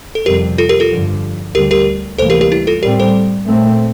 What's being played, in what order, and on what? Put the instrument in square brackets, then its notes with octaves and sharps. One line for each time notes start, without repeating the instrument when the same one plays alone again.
[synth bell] A4
[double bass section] F2 C3 G3 [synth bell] G4 A#4
[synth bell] F4 A4
G4 A#4
F4 A4
[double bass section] G2 D3 F3
[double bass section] D2 D3 G3 [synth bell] G4 A#4
[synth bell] G4 A#4
[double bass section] D2 C3 E3 G3 A#3 [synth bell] A4 C5
[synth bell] G4 A#4
G4 A#4
E4 G4
F4 A4
[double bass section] A2 G3 C4 [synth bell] G4 A#4
[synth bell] A4 C5
[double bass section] A#2 A3 C4